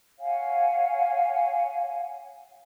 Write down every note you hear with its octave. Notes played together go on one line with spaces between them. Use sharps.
C#5 F5 F#5 G#5